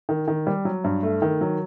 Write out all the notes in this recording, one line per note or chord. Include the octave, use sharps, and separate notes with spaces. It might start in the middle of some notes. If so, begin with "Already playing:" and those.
D#3
D#3
G3
F#3
G2
A3
D#3
F#3